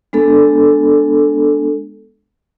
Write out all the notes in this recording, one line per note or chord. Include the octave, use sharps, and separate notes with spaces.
G#3 B3 D4 A4